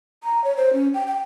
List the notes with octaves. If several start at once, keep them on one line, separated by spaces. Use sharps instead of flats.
A#5
C#5
C5
C#4
G5
G5